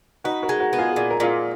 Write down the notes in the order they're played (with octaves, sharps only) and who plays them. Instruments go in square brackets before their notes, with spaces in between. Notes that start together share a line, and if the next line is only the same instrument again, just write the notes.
[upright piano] D#4 F#4 [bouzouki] B4
[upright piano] F#4 A#4
[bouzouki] G#3
[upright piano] F#4 A#4
[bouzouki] B3
[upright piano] F4 G#4
[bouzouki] A#2 [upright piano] G#4
[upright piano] A#4
[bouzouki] A#2 [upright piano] F4 G#4